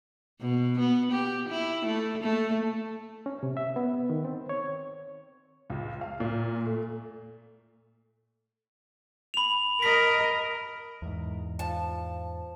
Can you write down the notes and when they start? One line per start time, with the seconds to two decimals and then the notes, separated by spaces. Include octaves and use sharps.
0.40 B2
0.79 B3
1.12 G4
1.49 E4
1.86 A3
2.22 A3
3.26 C#4
3.43 C3
3.57 E5
3.76 B3
4.10 D#3
4.25 C4
4.49 C#5
5.70 C#2
6.01 F5
6.20 A#2
6.66 A3
9.34 B5 F7
9.82 A#4 D#5 B6
11.02 E2 G#2
11.59 F3 A5